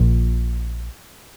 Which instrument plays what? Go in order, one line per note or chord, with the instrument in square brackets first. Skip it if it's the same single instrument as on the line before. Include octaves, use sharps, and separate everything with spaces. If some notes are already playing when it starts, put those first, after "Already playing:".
Already playing: [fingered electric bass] A#1 A#2